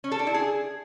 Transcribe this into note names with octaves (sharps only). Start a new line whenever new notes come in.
C#4
A4
D4
E4
G#4